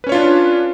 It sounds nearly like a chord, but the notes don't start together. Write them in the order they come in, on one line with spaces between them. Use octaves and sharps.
B4 C#4 C#5 F4 D4